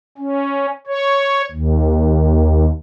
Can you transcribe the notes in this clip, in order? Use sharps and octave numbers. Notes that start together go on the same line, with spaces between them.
C#4
C#5
D#2